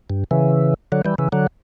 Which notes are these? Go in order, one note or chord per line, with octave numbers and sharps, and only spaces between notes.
G2
C#3 E3
D3 F#3
E3 G3
C#3 E3
D3 F#3